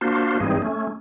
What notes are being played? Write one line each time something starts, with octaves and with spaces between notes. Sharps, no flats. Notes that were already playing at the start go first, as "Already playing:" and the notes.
A#3 D4 F4 F#4 C5
G#2 E3 G3 C4 D#4 G#4
A3 C#4